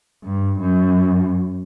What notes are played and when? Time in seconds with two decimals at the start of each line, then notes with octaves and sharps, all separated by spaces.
0.24 G2
0.60 F#2